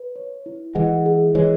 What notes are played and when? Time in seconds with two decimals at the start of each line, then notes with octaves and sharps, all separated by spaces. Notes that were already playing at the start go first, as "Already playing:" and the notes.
Already playing: B4
0.16 C#5
0.46 E4
0.75 E3 G#3 F#5
1.06 G#4
1.35 E3 G#3 C#5